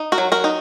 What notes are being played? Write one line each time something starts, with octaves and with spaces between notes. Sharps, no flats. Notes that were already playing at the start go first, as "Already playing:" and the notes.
Already playing: D#4
F#4 A#4
F#3
F#4 A#4
D#4